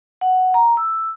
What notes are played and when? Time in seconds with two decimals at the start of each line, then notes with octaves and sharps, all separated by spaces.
0.21 F#5
0.54 A#5
0.77 E6